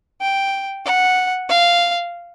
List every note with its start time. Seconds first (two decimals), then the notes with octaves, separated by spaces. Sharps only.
0.21 G5
0.85 F#5
1.49 F5